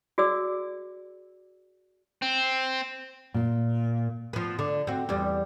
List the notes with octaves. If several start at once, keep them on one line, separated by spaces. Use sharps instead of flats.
F#4 G#4 D5 E6
C4
A#2
F3 B3
D3
C4 F#4
E2 G3